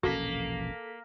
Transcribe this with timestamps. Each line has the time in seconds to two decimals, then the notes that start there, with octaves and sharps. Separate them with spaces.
0.03 E1 A#1 A#3 C#4 F#4 A4 B6